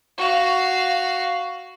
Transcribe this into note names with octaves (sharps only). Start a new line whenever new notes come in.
F#4 F5